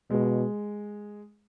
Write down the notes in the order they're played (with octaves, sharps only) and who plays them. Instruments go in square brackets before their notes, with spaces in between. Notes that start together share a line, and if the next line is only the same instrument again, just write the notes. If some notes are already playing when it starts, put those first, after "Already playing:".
[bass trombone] B2 [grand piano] G#3